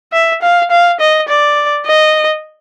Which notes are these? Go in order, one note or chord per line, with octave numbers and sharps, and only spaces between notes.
E5
F5
F5
D#5
D5
D#5